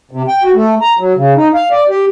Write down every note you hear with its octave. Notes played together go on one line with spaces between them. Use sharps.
C3
G5
F#4
A3
A#5
F#3
C#3
D#4
F5
D5
G4